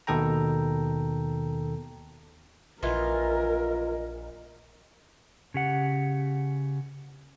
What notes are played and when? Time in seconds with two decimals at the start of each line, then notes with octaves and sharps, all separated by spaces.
0.07 D#2 B2 D#3 A4 G5 A#5
2.83 A#1 E3 F4 A#4 D#5
5.54 C#3 G4 F#5